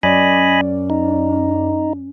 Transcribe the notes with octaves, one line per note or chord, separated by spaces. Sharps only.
F#2 C#4 D5 D#5 G#5 B5
D#4